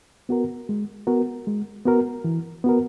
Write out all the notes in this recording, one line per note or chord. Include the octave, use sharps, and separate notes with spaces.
B3 F#4 A#4
G#3
B3 F#4 A#4
G#3
B3 F#4 A#4
E3
B3 F#4 A#4